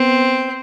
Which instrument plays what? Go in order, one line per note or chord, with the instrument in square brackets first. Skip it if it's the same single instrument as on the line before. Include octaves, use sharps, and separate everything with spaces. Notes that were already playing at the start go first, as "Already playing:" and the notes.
Already playing: [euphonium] B3 [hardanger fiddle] C4